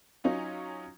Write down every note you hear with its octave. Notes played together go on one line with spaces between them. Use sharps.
F#3 C#4 D#4 F4